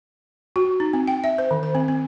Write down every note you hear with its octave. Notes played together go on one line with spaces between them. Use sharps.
F#4
D#4
C4
G5
E5
C5
D#3
C5
C4
C4